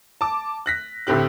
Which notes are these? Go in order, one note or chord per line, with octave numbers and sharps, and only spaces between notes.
A5 D6
F#6 A#6 B6
D2 A2 C4 G4 F#6